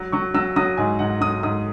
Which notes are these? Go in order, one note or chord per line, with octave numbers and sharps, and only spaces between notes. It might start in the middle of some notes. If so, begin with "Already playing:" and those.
Already playing: F#3
F#3 C#6
F#3 E6
F#3 D#6
G#2 G#5
G#2 F#5
F#3 D#6
G#2 D#6